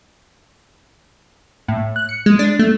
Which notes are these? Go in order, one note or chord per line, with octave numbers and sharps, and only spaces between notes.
A2
F#6
C#7
G#3
D4
A3